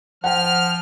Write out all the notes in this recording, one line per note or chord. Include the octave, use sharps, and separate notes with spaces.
F3 F#5 G5 F6